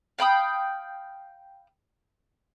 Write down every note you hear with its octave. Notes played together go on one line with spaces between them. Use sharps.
F5 G5 B5 D#6